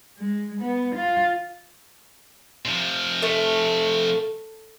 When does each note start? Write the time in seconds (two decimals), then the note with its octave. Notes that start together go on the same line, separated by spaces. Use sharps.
0.18 G#3
0.61 B3
0.96 F4
2.65 C3 F3
3.22 A3